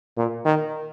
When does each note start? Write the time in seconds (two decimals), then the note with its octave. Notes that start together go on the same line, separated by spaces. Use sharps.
0.17 A#2
0.45 D#3